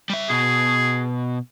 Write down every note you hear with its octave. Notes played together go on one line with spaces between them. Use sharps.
G3 E5
B2 G#4